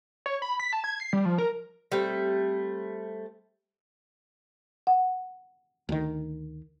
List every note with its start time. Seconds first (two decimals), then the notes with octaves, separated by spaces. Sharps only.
0.26 C#5
0.42 B5
0.60 B6
0.73 A5
0.84 G#6
1.00 C7
1.13 G3
1.25 F3
1.38 A#4
1.92 G3 A3 C4
4.87 F#5
5.89 D2 D#3